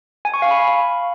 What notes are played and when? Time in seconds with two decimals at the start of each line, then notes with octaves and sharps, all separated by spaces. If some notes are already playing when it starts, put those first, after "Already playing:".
0.25 G#5
0.34 C#6
0.42 F5
0.51 B5